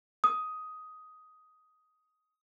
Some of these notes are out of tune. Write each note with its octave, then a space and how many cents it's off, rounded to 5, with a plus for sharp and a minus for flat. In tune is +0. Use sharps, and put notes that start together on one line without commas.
D#6 +10